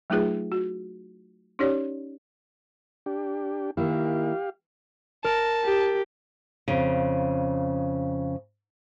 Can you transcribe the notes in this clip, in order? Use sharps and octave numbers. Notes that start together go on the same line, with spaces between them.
F#3 A3 D#4 F4 G#4 B4
F#4
C#4 D#4 G4 C#5 D5
D4 G4
D#3 A#3 E4 G4 F5
A#4 A5
G4
F2 C#3